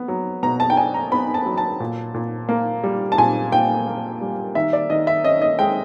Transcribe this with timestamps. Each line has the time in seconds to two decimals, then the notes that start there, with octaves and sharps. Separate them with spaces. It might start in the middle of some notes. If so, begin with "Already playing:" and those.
Already playing: B3
0.08 F#3
0.43 B2 A#5
0.60 A5
0.70 G5
0.77 D4 G#5
0.94 A#5
1.11 B3 B5
1.34 A5
1.46 F#3
1.58 A5
1.80 A#2
2.14 A#2
2.49 A#3
2.84 G3
3.12 A5
3.18 A#2 G#5
3.52 A#2 G5
3.87 A#3
4.21 G3
4.55 D#3 E5
4.73 D5
4.90 D#3 D#5
5.07 E5
5.24 C#4 D#5
5.42 D#5
5.59 G#3 G5